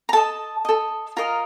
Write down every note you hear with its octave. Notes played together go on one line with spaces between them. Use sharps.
A#5
A4 D#5 A5
A4 D#5
F4 A#4 D#5 A#5